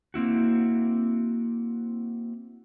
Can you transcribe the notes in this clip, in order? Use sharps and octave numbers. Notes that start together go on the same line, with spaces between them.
A#3 C4 E4 F#4